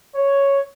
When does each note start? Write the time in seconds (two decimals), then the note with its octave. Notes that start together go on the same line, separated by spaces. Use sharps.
0.15 C#5